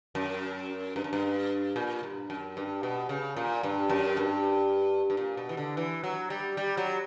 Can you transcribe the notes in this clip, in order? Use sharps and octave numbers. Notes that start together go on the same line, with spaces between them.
F#2
G2
F#2
G2
A#2
G2
F#2
G2
B2
C#3
A#2
G2
F#2
G2
G2
A#2
B2
E3
D3
E3
F#3
G3
G3
F#3